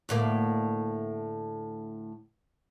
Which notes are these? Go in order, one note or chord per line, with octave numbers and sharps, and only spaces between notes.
D2 A2 A#3